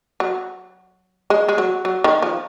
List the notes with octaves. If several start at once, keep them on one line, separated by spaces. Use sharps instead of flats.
F#3
G#3
G#3
F#3
F#3
D#3
F3